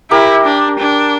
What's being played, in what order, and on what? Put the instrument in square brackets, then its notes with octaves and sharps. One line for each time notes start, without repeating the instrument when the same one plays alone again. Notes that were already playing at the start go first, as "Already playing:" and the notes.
[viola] E4 [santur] G4 A#4
[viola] D4
D4